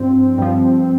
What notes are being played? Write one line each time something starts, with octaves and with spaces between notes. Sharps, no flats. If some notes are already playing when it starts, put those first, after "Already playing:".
Already playing: G2 F3 C4
G2 F3